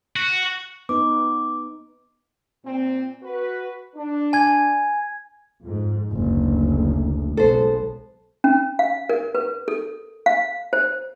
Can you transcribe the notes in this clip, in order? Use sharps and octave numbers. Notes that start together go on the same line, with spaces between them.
F#4
B3 D#4 B4 D6
A#2 C4
F#4 B4
D4
G#5 G#6
F2 G#2
F#1 D2
B1 G#3 B3 A4 C5
C#4
F5
A#4
B4
A4
F5
C5